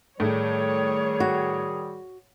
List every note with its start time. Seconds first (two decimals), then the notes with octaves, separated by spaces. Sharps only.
0.20 A2 D#3 G3 G#4 C#5
1.20 F#4